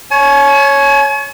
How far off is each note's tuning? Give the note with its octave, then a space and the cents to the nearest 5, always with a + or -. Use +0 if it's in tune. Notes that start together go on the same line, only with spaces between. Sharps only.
C#5 +0 G#5 +45